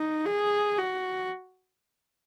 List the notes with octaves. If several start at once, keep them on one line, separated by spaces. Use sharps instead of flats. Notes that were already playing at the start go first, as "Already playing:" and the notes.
Already playing: D#4
G#4
F#4